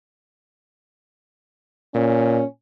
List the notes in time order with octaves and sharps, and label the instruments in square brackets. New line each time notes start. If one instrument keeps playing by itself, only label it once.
[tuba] A#2 [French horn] C#4